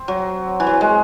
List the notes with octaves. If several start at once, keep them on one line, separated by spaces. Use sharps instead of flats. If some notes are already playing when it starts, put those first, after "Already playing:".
Already playing: C4
F#3
E3
F#3
G#3